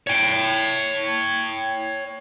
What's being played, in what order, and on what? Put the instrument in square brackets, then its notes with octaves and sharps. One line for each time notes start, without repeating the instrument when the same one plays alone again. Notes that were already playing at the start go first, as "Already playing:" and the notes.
[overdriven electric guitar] C#5 G5